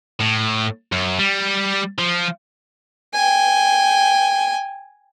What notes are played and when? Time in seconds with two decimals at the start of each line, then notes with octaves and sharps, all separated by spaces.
0.21 A2
0.92 F#2
1.19 G3
1.99 F3
3.14 G5 G#5